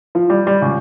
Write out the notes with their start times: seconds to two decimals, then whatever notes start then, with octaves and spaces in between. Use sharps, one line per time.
0.15 F3
0.30 G3
0.47 G3
0.62 C#2